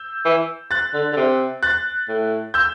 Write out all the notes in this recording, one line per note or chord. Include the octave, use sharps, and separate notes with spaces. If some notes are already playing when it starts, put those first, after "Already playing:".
Already playing: E6 G6
E3
F#6 A6
D3
D3
C3
F#6 A6
A2
E6 G6